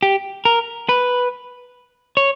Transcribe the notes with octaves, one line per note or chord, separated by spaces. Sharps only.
G4
A#4
B4
C#5